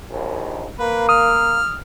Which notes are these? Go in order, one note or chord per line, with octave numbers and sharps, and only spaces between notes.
A#1 D#2
A#3 B4
D#6 F6